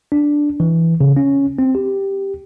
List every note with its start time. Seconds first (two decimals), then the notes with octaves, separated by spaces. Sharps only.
0.12 D4
0.60 E3
1.01 C#3
1.17 C#4
1.59 C4
1.75 G4